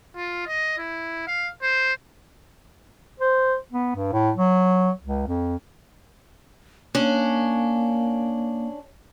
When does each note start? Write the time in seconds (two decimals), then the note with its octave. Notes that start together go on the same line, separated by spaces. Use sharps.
0.16 F4
0.47 D#5
0.78 E4
1.27 F5
1.62 C5
3.20 C5
3.72 B3
3.95 G2
4.12 A2
4.36 F#3
5.04 C#2
5.27 F2
6.95 A#3 C#4 D4